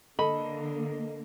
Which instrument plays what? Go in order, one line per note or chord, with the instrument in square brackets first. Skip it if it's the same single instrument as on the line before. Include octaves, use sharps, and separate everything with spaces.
[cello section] D3 A#3 [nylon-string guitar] A4 [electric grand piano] D#5 [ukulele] B5